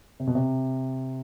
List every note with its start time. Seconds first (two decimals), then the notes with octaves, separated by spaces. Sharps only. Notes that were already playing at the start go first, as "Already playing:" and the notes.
0.20 C3
0.27 B2
0.35 C3